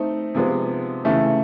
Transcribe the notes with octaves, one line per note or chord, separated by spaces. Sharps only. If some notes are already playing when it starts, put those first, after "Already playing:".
Already playing: A3 C4 D#4
C3 F3 G#3 B3
C#3 E3 A3